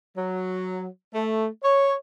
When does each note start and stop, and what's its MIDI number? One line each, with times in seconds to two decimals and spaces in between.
0.16 0.86 54
1.14 1.46 57
1.63 1.93 73